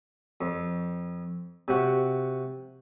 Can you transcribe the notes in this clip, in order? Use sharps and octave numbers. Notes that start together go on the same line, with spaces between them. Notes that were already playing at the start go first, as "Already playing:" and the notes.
F2
C3 F#4